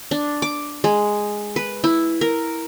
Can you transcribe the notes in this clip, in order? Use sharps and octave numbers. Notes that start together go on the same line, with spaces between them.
D4
D6
G#3
B4
E4
A#4